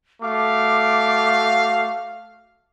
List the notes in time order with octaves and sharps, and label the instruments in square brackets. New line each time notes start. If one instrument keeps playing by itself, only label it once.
[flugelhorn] A3 [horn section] F#4 F5 [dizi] D6